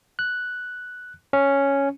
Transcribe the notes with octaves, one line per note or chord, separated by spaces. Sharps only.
F#6
C#4